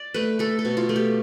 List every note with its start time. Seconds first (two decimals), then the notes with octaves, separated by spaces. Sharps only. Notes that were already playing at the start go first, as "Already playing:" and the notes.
Already playing: D5
0.14 A3 B4
0.39 A3 A4
0.59 A4
0.65 B2
0.77 F4
0.89 A3
0.96 G4